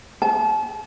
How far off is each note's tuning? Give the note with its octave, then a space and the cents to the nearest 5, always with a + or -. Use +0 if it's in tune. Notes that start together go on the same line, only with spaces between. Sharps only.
A5 -35